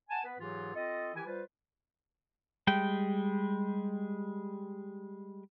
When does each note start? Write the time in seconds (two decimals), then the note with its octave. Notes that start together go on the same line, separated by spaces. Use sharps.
0.09 F#5 G#5 A5
0.24 B3 B4
0.39 G#2 E3 F#3 F4 G4 G#4
0.74 C4 F4 A4 D#5
1.14 D#3 E3 E4 G4 G#5
1.26 G3 F4 B4 C5
2.67 G3 G#3 G5